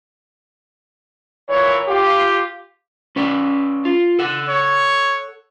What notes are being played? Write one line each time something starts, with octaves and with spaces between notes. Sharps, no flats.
A#2 E3 C#5
F4 G4
C#4 B4 D5
F4
A4 F#5
C#5